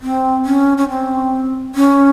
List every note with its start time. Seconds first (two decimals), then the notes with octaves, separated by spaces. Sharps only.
0.02 C4
0.45 C#4
0.78 C#4
0.89 C4
1.75 C#4